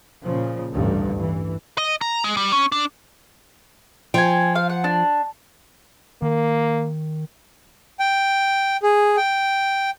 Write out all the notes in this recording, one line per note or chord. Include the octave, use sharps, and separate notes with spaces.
A#2 C#3 F3
A1 D2 G2
E3
D#5
A#5
G#3
G3
C#4
D4
F3 G5 G#5
F5
F#5
D4
D#3 A#3
G5
G#4
G5